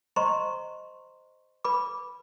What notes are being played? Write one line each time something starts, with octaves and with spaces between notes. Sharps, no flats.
C5 D#5 A#5 C6 C#6
B4 B5 D6